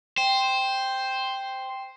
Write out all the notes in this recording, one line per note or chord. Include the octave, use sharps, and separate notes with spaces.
C5 G5